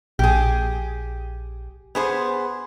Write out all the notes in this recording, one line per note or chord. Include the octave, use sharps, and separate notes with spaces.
A#1 G4 G#4
B3 G#4 C5